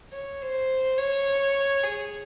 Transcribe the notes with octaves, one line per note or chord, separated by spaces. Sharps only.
C#5
C5
C#5
G#4